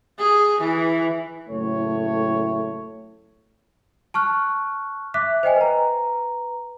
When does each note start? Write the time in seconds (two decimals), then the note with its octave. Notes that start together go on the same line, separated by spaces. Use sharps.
0.19 G#4
0.61 E3
1.49 F#1 A2 A3 C#5
4.14 A5 C#6 F6 F#6
5.14 E5 D6 F#6 B6
5.43 C5 D#5 G5 G#5
5.56 B4 A#5